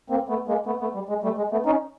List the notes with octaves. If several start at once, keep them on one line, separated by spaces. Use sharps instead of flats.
A#3 C4
A3 B3
G#3 A#3
A3 B3
A3 B3
G3
G#3
G3 A3
G#3
A3 B3
C#4 D#4